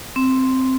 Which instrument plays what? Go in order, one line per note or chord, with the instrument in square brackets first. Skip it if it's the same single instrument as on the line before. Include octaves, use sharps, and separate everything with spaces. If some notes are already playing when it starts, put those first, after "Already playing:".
[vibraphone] C4